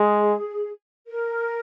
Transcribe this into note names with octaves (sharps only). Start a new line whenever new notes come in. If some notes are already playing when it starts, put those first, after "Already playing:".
Already playing: G#3 G#4
A#4